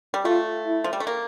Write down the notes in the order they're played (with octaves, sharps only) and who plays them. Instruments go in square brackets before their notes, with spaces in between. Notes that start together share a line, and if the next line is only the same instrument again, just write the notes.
[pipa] G3
[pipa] A3 [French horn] F4
[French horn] E4
[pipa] F3
G3
A3
A#3